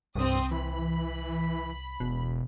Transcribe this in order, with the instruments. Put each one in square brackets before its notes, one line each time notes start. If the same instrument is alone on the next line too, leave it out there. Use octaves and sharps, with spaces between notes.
[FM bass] C2 [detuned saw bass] G2 [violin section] C4 D#6
[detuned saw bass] E3 [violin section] B5
[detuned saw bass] E1 [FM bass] B2